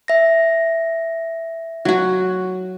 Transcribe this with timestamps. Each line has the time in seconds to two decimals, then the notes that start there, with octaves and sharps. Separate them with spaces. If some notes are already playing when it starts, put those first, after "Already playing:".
0.08 E5 A#6
1.85 F#3 F#4